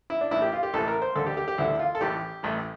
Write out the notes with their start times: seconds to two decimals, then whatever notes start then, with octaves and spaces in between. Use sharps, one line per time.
0.10 E4
0.21 D4
0.31 A1 A2 E3 E4
0.42 G4
0.53 F4
0.63 G4
0.73 A1 A2 E3 A4
0.88 A#4
1.02 C5
1.16 D2 D3 A4
1.27 G4
1.37 G4
1.48 G4
1.58 D2 D3 E4
1.79 F4
1.95 A4
2.01 A1 A2 E3 G4
2.43 A1 A2 E3